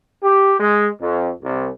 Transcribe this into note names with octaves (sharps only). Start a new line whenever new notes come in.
G4
G#3
F2
C2